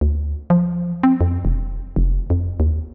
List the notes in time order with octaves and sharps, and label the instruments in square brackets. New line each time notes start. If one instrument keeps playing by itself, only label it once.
[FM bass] D2
F3
C4
F2
E1
F1
F2
D#2